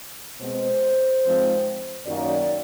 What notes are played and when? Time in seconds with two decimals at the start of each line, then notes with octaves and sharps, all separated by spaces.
0.41 B2 G#3 C4 C5
1.24 G#2 F3 G#3 C4
2.06 F#2 D#3 F#3 A#3 D5